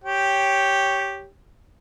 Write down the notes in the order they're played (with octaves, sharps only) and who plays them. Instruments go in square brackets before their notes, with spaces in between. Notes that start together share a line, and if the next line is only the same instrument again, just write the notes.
[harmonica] G4 C#5 G5